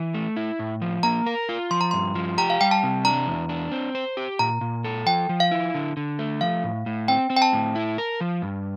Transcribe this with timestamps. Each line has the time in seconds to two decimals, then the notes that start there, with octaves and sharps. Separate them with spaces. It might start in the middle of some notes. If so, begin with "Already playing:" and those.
Already playing: E3
0.14 A3
0.36 E4
0.59 A2
0.82 F3
1.03 A#3 A#5
1.26 A#4
1.49 F4
1.71 F3 C6
1.81 A#5
1.91 G2 C6
2.15 F3
2.38 G4 A#5
2.50 F5
2.61 G3 G5
2.71 A5
2.83 C3
3.05 D4 A#5
3.27 E2
3.49 D4
3.72 C4
3.95 C5
4.17 G4
4.39 A#2 A#5
4.61 A#2
4.84 A4
5.06 F3 G5
5.29 F3
5.40 F5
5.52 E4
5.74 D3
5.97 D3
6.19 A3
6.41 F3 F5
6.64 A2
6.86 A2
7.08 C4 G5
7.30 C4
7.36 G5
7.42 A5
7.53 A2
7.75 E4
7.98 A#4
8.21 F3
8.42 G2